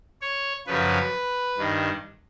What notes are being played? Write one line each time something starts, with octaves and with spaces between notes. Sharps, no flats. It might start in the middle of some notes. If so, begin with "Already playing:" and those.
C#5
F#2 C#3 F3 B4
G2 D#3